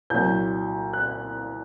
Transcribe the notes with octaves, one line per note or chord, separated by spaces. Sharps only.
C2 A#2 F#3 G6
F#6